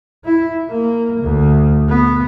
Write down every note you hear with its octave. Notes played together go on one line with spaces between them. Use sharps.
E4
A#3
D2
B3